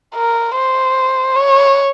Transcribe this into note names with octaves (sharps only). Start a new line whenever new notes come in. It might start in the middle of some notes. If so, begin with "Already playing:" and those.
A#4
C5
C#5